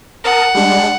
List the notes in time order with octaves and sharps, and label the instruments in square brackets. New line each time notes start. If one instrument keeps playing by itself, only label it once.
[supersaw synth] A#4 A5 D#6 [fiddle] F#5
[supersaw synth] G3 G#3 D4